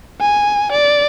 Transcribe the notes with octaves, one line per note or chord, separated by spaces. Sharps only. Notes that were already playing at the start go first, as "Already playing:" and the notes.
G#5
D5